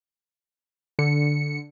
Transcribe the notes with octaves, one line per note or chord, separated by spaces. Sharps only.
D3 C#7